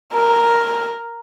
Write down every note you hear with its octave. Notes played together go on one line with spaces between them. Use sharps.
A#4